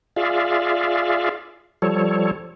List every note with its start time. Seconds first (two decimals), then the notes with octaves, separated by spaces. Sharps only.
0.16 F4 G#4 D5 E5 F5
1.82 F3 G3 A4 C#5